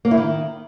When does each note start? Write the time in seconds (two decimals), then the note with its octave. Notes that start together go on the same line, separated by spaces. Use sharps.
0.05 A#3
0.11 E4
0.17 D#3